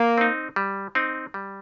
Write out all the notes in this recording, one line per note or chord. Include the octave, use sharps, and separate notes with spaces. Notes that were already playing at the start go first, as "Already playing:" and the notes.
Already playing: A#3
C4 D#4
G3
C4 D#4
G3